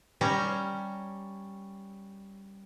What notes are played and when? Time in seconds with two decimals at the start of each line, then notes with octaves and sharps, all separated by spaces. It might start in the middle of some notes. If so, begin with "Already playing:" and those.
0.21 G3 C#4 A#5